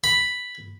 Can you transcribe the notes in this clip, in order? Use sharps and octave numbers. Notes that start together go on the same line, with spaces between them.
B5